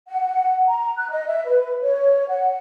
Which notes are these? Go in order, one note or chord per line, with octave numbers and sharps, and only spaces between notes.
F#5
A#5
F#6
D#5
E5
B4
C#5
F#5